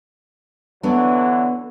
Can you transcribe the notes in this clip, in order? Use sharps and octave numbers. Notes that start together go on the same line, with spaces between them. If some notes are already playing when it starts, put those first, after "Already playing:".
D3 E3 F#3 B3 D4